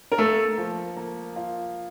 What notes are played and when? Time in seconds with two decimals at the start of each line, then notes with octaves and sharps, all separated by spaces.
0.12 A#4
0.17 A3 A#3 A4
0.58 F3
0.97 A#3
1.36 F4